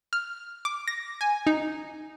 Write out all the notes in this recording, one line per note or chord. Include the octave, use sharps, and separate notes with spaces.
F6
D6
A#6
G#5
D#4